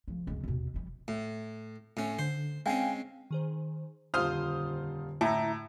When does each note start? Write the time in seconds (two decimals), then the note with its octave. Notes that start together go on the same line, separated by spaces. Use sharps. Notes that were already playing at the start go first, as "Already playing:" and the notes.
0.08 C#2 F3
0.27 C#2 F#2
0.43 D#2 B2
0.74 F3 G3
1.08 A2
1.97 A2 C#4
2.19 D3 C5
2.66 G#3 C4 C#4 F5 G5 G#5
3.31 D#3 G#4 C5
4.14 D#1 F2 D3 F4 C5 F5 D#6 F6
5.21 A2 E4 E5 A5 A#5